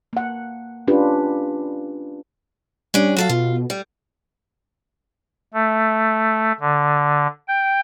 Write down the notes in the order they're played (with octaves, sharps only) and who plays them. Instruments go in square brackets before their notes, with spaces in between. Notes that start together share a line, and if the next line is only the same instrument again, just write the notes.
[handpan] A#3 F#5
C#4 D4 F4 G4 B4
[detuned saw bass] G3 [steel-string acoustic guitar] C#4 D4
[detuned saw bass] F#3 [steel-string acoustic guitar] F#4 A4 F5
[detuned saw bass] B2 [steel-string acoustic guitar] F4
[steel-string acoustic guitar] G3
[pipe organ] A3
D3
G5